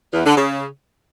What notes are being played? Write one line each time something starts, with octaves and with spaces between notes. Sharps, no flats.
E2
D3
C#3